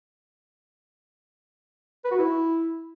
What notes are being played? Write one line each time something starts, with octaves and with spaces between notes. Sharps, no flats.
B4
F#4
E4